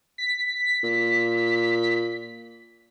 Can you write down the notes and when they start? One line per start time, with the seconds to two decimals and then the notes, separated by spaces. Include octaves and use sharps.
0.18 B6
0.84 A#2